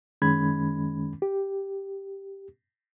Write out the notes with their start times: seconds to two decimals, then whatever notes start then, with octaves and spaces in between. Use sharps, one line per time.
0.22 F#2 D#3 G#3 C#4 B5 G#6
1.22 G4